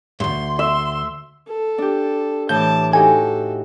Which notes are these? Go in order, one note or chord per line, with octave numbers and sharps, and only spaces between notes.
D2 G2 C6
E5 C6
A4
D4 G4
A2 E3 A5 D6 G6
D#4 F#4 G4 A4 G#5